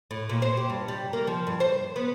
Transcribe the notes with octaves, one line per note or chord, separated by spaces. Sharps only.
A2
A#2
C5
G4
G2
G3
A#3
F3
G2
C5
B3